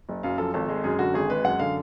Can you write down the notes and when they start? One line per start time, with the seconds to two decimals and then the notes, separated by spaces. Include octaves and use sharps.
0.09 F#1
0.23 F#2 F5
0.38 F3 A4
0.54 G#1 A4
0.68 G#3
0.84 F#2 G#4
0.99 D3 F#4
1.14 G#1 G#4
1.29 G#3 B4
1.44 F#2 F#5
1.60 D3 F5